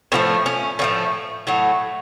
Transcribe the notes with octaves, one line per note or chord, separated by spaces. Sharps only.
A2 F3 A3 C4
C#4
A2 F3 A3 C#4
A2 F#3 A3